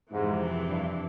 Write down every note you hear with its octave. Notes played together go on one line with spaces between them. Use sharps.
F2 G#2 C3 E3
G2